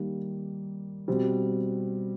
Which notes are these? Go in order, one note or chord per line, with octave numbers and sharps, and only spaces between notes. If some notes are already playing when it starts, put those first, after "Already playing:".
Already playing: D#3 G3 A#3
B2 G3 C4